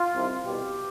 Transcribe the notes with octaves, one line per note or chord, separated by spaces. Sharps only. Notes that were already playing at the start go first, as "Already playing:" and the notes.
Already playing: F4
C2 C3 D#3
C2 B2 G4